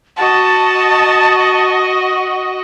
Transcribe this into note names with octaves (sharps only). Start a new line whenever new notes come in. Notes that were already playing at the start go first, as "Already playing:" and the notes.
F#4 D#5 A5